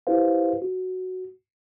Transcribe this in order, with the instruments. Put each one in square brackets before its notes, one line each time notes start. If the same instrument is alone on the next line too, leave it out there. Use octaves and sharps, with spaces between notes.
[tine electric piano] E4 G4 B4 C5 F5
F#4